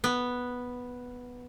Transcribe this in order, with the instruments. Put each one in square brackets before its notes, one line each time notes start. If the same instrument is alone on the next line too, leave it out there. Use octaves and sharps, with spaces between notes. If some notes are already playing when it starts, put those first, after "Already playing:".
[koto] B3